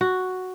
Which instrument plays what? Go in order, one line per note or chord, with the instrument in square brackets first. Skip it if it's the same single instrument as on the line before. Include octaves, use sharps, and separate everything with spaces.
[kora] F#4